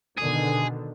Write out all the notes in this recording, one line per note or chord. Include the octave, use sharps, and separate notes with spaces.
B2 D3 D#3 G#4